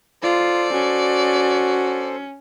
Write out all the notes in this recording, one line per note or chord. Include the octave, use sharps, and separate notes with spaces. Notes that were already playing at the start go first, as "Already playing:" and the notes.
F4 A4 C5 D5
C#4 F#4